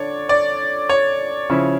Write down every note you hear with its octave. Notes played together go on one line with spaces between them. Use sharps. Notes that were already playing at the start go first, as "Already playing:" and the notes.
Already playing: D3 D4 C#5 D5
D5
C#5
C#3 F3 C#4 E4